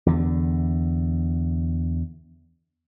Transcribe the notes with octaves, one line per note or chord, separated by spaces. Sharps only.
E2 D3